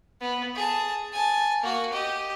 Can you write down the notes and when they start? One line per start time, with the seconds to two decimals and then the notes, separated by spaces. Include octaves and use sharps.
0.21 B3
0.55 G#4 A5
1.13 G#5 A5
1.63 A#3 F#4
1.92 G4 D#5